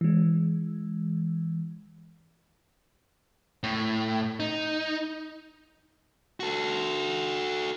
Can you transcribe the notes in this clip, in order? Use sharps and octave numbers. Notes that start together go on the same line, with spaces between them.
E3 G#3
A2
D#4
F#4 A4